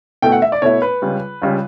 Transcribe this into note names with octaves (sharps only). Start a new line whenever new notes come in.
B2 A3 E4 G5
F#5
E5
D5
B2 A3 E4 C#5
B4
C#2 C#3 G3
C#2 C#3 G3